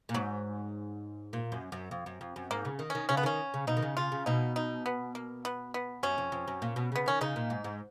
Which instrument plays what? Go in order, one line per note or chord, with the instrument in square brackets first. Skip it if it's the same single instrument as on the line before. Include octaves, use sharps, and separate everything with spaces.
[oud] A#2
[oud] G#2 [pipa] F#3
[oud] A#2
F#2
F#2
F2
F#2
F2
F#2
[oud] G#2 [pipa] A#3
[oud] C#3
D#3
[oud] D#3 [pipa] C#4
[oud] C#3 [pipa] C#4
[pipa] B3
[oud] D#3 [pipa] C#4
[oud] C#3
[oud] B2 [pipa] D#4
[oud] D#3
C#3
[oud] C#3 [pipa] F4
[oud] C#3
[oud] B2 [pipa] D#4
[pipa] D#4
B3
A#3
B3
B3
[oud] F#2 [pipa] C#4
[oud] F2
F2
F#2
A#2
B2
[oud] C#3 [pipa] B3
[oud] D#3 [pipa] C#4
[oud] C#3 [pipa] D#4
[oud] A#2
G#2
G#2